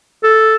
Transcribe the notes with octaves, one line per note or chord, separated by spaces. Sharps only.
A4